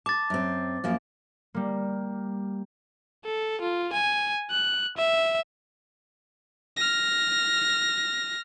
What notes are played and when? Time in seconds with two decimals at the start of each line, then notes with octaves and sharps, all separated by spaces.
0.06 A5 D6 A6
0.30 F#2 C4
0.84 F#2 F3 A#3
1.54 G3 A#3
3.25 A4
3.61 F4
3.93 G#5
4.50 F#6
4.97 E5
6.77 F6 A#6